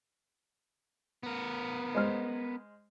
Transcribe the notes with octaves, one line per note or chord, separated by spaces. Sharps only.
B3 A#4
G#3 C5 F6